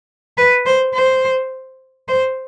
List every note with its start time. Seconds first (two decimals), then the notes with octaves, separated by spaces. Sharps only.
0.37 B4
0.66 C5
0.94 C5
2.08 C5